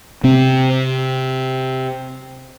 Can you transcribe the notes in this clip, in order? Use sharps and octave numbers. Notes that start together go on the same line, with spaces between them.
C3 C4